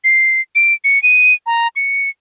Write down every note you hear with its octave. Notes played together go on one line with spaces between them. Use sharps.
C7
D7
C#7
D#7
A#5
C#7